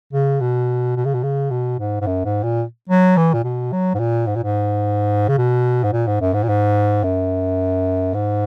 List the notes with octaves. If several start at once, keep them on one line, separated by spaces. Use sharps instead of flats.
C#3
B2
B2
C#3
B2
C#3
B2
G#2
G#2
F#2
G#2
A#2
F#3
E3
A#2
B2
F#3
G#2
A#2
G#2
A#2
G#2
C#3
B2
G#2
A#2
G#2
F#2
G#2
A#2
G#2
F#2
G#2